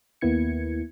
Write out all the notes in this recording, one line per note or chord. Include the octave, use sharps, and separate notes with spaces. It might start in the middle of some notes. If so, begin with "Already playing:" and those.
D#2 A#3 B3 E4 G#6 C#7